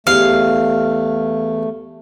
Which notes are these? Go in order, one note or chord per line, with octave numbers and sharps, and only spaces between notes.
E2 A3 G4 F5